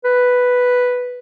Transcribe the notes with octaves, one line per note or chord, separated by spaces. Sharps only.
B4